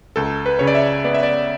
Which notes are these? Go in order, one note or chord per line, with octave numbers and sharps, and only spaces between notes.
C#2 A4
B4
C#3 C#5
D5
E5
B3 D5
E5
D5